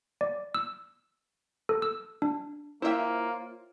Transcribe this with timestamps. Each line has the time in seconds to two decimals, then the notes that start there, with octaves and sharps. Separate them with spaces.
0.21 D5
0.55 E6
1.69 A4
1.82 E6
2.22 D4
2.82 A#3 E4 F4 C5 C#5 E5 G5